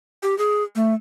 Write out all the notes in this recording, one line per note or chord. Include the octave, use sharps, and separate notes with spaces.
G4
G#4
A3